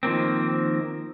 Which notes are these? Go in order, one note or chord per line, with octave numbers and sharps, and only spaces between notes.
D#3 F3 A#3 C4